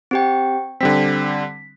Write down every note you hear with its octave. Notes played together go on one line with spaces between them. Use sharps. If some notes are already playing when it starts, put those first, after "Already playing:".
C4 G4 G5
D3 G3 C4 B6